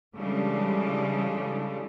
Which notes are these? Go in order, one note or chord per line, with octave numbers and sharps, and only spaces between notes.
C#3 E3 G3 G#3 D4 A4